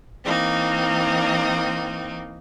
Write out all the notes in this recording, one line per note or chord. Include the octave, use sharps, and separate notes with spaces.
E3 A#3 C4 D#4